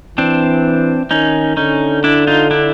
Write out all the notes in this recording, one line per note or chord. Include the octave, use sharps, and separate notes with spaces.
E3 C4 D4
D#3 C#4 D#4
D3 C#4 D#4
D4 E4
D#4 F4
D4 E4